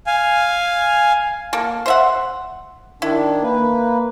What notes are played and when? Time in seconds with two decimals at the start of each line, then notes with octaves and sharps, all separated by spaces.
0.07 F5 G#5
1.53 A#3 A4
1.86 C5 E5 F#5
3.02 D#3 D4 E4
3.43 A#3 B4